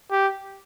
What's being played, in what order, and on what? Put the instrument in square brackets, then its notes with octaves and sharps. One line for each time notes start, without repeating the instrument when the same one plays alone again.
[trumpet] G4